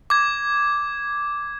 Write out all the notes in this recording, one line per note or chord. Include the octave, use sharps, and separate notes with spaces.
D6 G#6